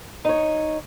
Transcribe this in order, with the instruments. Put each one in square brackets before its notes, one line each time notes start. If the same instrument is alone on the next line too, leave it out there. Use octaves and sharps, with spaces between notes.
[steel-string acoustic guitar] D#4 C#5